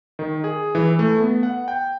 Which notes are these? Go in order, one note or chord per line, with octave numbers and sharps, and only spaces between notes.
D#3
G#4
E3
A3
B3
F#5
G5